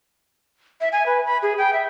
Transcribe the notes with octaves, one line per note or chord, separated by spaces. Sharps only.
E5
G#5
B4
B5
G#4
G5
E5